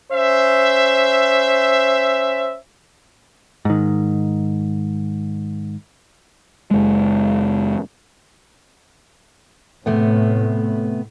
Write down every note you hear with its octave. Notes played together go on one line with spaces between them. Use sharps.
C#4 C5 E5
G#2 D#3
F#1 G#3
A2 C3 A3 B3